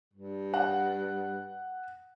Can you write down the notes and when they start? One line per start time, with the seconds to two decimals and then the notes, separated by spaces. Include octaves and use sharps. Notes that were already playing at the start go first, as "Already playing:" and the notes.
0.13 G2
0.54 F#5